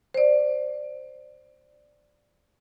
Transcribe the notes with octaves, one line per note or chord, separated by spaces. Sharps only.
C5 D5